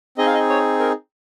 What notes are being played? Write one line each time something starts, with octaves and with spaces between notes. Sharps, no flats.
C4 D#4 G#4 D#5
F5
D#5
C#5
A#4